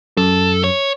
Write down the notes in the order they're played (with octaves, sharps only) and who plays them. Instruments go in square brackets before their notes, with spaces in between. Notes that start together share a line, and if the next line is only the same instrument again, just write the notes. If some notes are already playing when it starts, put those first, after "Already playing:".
[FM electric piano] F#2 [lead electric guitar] A4
[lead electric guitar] C#5